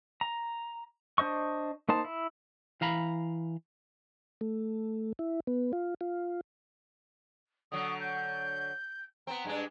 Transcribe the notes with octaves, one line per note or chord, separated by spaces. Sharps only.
A#5
D4 C5 D#5 C#6
A#3 D#4 C5 A5
E4
E3 F5 A#5 B5
A3
E4
B3
F4
F4
D3 F#3 D#6
G6
B3 C4 A#5
G2 G#3 D4